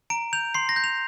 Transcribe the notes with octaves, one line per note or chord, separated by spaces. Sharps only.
A#5 D7
G6 F7
C6 C7
A#6
G6
F7